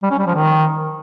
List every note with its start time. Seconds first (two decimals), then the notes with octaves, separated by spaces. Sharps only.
0.03 G3
0.11 C#4
0.19 G3
0.27 F3
0.35 D#3